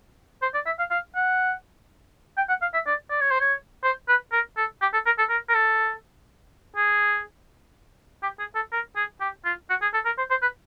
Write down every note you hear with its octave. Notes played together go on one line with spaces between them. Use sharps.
C5
D5
E5
F5
F5
F#5
G5
F#5
F5
E5
D5
D5
C#5
C5
C#5
C5
B4
A#4
A4
G4
A4
A#4
A4
A#4
A#4
A4
G#4
G4
G#4
A4
A#4
G#4
G4
F4
F#4
G#4
A4
A#4
C5
C5
B4